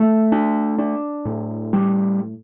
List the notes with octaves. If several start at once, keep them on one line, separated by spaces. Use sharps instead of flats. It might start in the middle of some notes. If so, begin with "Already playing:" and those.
Already playing: A3
D4
D4
A2
G3